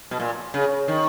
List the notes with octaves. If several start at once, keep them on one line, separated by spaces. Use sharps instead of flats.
B2
A#2
C#3
D#3